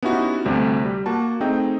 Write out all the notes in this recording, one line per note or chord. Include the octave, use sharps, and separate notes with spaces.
B3 C#4 D#4 E4 F#4 G4
D2 C3 G3 A3
G3
A#3 F#4 A5
A3 C4 D#4 G#4 D#5 G5